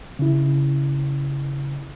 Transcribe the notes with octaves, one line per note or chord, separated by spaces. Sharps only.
C#3 E4